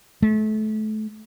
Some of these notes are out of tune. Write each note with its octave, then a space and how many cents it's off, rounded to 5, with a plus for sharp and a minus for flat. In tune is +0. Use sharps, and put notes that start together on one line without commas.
A3 -30